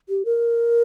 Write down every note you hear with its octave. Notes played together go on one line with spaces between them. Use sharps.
G4
A#4